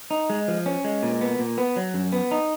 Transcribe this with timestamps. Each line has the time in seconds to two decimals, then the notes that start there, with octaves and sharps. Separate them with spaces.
0.11 D#4
0.30 G#3
0.48 F3
0.66 C#4
0.84 G#3
1.03 A#2
1.21 B3
1.39 A#2
1.58 B3
1.76 F#3
1.94 F#2
2.12 B3
2.31 D#4